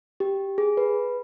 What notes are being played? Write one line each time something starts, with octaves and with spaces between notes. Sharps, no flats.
G4
G#4
B4